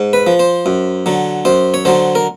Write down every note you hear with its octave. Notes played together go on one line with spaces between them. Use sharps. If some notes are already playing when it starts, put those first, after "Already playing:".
Already playing: G#2
B4
F3
C5
F#2
D3 F#3
F#2 C5
C#5
D3 F#3 C5
A#4